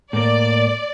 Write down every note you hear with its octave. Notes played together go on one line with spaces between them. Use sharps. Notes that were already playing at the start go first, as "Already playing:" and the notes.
A2 A#3 D5